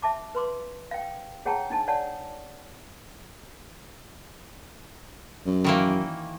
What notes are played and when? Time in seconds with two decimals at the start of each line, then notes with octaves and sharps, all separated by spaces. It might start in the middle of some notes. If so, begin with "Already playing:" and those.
0.02 E5 A5 D6
0.35 B4 C6 D6
0.91 F5 G5
1.45 G#4 C#5 F#5 G5 A5 A#5
1.70 D4 D#4 A5
1.88 C#5 D5 F#5 A5
5.46 F#2
5.64 D#3 E3 A#3